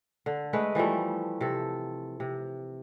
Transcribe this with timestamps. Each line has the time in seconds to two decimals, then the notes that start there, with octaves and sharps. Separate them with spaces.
0.26 D3
0.53 G#3 A3 B4
0.75 E3 F3 G3 A3
1.41 C3 A4
2.20 C3